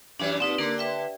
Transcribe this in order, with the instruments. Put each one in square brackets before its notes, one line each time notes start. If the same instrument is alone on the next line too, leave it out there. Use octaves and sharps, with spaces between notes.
[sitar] F#2 E3 G3 [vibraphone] D4
[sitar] A#2 [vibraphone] C4 D#4 B4
[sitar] D3 [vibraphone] A#3 D4 A#4
[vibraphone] B4 E5 G5